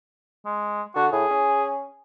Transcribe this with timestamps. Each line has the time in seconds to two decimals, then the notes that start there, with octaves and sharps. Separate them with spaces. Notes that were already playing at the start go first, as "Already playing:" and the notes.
0.46 G#3
0.96 D3 F#4
1.12 A2 G#4
1.31 C#4